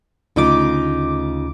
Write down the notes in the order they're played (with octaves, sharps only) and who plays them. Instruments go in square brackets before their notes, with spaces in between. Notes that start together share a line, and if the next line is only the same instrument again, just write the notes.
[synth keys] D2 D6 [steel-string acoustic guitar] C#3 D#4 F4